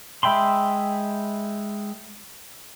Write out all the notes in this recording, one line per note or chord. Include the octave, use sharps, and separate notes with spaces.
G#3 E5 G5 B5 C6